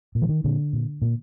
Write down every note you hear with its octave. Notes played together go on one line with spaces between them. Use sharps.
A#2
E3
D#3
A#2 D3
A#2
A#2